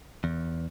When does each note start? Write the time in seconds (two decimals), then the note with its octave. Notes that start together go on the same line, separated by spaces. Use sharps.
0.24 E2